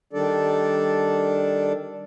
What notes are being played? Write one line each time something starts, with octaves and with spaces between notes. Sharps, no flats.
D#3 G3 D4 A4 D5